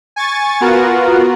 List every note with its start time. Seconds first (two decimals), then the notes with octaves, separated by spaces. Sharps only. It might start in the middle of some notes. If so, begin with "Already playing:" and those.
0.16 G#5 C#6 A6
0.61 B3 F4 F#4 A#4 F#5